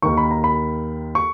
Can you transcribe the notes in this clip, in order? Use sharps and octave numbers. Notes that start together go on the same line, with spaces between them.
D#2 D#3 C#6
B5
A#5
B5
C#6